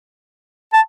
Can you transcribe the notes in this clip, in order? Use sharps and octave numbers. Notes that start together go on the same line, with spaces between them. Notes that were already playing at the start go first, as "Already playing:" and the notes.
A5